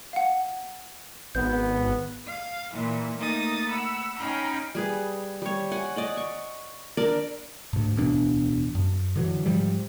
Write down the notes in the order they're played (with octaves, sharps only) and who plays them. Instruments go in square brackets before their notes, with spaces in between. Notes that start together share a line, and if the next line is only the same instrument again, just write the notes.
[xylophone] F5 F#5
[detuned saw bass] G#1 [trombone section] B3 [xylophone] G6
[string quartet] F5
A#2 E3
A3 A#3 D#4 D#6 A6
F#5 B5 E6
C#4 D#4 F5 G5 A#5 B5
[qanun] G3 G#4 B4
G3 C#5
F#5 G#5
D5 D#5 F#5
C#6
D4 A#4 D5
[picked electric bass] D2 G#2
D1 E2 B2 D4
F#2
D3 E3 F#3
G#2 F3 G3